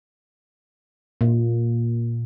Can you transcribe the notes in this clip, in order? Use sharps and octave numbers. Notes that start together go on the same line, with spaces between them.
A#2